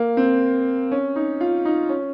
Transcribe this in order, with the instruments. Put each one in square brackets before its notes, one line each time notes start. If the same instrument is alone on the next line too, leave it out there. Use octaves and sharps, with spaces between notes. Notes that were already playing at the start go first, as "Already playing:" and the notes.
Already playing: [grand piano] A#3
C4
C#4
D#4
F4
D#4
C#4